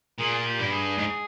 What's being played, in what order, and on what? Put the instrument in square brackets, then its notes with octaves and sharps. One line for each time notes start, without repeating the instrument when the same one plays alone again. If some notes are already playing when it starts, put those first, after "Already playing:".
[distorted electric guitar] A#2 [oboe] G#4
[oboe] G4
[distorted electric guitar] G2
[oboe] G#4
[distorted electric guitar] G#2